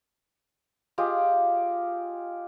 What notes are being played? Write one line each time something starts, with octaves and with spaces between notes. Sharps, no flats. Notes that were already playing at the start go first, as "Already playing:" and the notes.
F4 G4 G#4 D#5